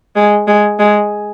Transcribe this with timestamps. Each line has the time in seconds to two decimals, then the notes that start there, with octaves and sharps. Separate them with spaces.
0.16 G#3
0.48 G#3
0.79 G#3